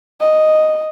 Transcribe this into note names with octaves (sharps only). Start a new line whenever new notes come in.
D#5